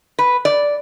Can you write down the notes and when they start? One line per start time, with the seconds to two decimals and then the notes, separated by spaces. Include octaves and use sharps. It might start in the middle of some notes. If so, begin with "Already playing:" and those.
0.19 B4
0.45 D5